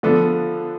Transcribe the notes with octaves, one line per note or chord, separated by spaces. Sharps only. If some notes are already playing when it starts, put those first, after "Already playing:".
D3 F3 B3 D4 A4